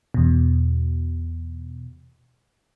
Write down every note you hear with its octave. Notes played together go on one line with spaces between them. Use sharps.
E2 B2